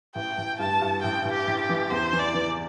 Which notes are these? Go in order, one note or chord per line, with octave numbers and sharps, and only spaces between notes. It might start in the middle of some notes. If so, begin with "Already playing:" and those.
A1 G5
A1
G2 A5
G2
A1 G5
A1
G4
A1
G4
E3
E2 C5
E3
D5
E3